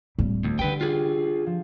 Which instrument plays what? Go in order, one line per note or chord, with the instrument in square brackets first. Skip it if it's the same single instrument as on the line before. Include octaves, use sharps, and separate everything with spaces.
[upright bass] D1 G3
[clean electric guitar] D2
[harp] D3 G3 [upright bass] C#4 [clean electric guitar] B4 G5
[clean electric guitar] F4 G#4
[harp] F3